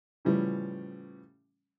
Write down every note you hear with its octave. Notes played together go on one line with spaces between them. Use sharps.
A2 C#3 E3 F3 G3 C#4